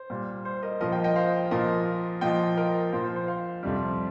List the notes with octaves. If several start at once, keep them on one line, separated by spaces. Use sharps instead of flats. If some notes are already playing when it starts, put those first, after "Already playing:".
Already playing: C5
A#2 G3
C5
A#4 D#5
A#2 F3 A#4 D#5
D#5 G5
D#5 G5
C5 F5
A#2 F3 A#4 D#5
A#2 F3 D#5 G5
A#4 D#5
A#2 F3 C5
C5
C5
C5 F5
F2 C3 G3